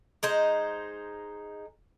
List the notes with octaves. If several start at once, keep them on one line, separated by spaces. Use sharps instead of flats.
G#3 D#4 C5